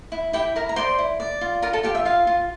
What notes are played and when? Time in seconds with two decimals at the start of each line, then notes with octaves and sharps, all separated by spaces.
0.12 E4
0.33 E4 G4 G5
0.56 E4 A#4 A#5
0.69 A#5
0.76 C5 D5 C6
0.98 E4
1.20 D5
1.41 F4
1.62 F4 A#4 A#5
1.73 A4 A5
1.83 F4 G4 G5
1.95 E5
2.05 F4 F5
2.27 F4